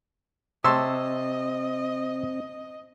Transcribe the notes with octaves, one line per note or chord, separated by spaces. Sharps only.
C3 C4 C#5 D#5 E5 A5 C6 E6